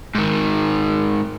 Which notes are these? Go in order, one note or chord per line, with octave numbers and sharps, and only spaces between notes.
G#2 D#3